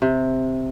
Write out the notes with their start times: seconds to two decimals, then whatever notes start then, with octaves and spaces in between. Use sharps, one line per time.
0.02 C3